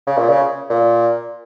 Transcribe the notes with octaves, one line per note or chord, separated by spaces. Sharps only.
C#3
A#2
C#3
A#2